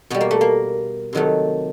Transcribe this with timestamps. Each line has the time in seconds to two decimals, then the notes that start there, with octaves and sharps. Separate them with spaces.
0.10 B2 G3 B3
0.21 A#3
0.31 A3
0.41 A#3
1.13 C3 D#3 F#3 A3